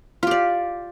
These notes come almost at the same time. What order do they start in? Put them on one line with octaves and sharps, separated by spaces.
F4 G4 D5